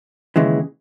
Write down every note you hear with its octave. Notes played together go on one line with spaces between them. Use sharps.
D#2 C#3 E3 G#3